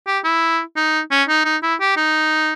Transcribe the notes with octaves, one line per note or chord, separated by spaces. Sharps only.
G4
E4
D#4
C#4
D#4
D#4
E4
G4
D#4